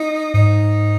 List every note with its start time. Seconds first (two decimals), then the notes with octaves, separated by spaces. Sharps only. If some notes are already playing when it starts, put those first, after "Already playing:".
Already playing: D#4
0.34 G#2 D#4